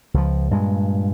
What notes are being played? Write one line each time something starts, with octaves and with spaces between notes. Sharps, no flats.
C#2 F3
G2 A#2 G#3